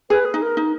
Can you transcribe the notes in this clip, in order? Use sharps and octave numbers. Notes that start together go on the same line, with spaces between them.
G#4 B4
G#4
D#4
A#4
D#4